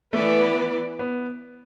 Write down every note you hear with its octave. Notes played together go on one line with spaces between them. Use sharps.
E3 A3 B3 E4 B4 D5
B3